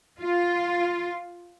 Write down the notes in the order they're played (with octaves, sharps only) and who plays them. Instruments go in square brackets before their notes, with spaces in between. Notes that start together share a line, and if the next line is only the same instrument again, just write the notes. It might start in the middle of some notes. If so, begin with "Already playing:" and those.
[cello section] F4